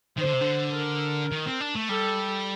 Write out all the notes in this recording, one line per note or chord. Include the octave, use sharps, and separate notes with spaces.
D#3 C5
D3
C3
D3
A#4
D#3
C4
D4
A3
G3 A4